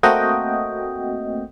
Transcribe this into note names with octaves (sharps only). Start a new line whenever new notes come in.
A3 A#3 C4 F#4 D#5 G5